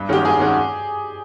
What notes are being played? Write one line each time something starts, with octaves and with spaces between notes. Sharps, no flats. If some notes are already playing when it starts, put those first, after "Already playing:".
Already playing: G2
D#3 G#3 C#4 F#4 G4
G2 G#4
D#3 G#3 C#4 F#4